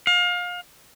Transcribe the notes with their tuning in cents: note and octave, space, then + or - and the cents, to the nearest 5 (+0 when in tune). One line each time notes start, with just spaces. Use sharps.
F5 +30